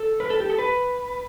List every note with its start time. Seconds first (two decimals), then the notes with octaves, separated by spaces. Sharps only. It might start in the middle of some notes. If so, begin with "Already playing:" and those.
Already playing: A4
0.20 B4
0.30 A4
0.40 G4
0.50 A4
0.59 B4